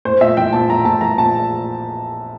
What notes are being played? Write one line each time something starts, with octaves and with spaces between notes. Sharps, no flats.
A2 C5
A#1 E5
E3 G5
A#1 A5
A2 A#5
A#1 A5
E3 A#5
A#1 A5